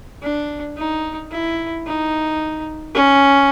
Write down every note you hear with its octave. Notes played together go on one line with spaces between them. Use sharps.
D4
D#4
E4
D#4
C#4